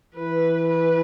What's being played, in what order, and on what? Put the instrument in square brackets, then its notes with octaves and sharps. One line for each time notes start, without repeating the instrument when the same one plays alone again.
[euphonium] E3 [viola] B4
[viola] B4